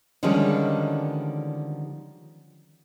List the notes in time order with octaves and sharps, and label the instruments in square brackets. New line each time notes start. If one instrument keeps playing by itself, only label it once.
[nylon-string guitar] D3 D#3 F3 G3 G#3 C#4